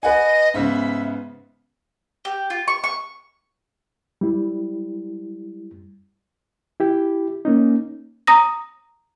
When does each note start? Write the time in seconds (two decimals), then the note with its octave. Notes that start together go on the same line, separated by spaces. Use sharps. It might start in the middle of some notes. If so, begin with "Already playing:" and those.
0.03 B4 D#5 F#5 G#5
0.54 G#2 C#3 B3 E5
2.25 G4
2.50 F4
2.68 C#6
2.84 C#6
4.21 G3 E4
6.80 E4 G4
7.45 A#3 C#4 D#4
8.27 A#5 D#6 A#6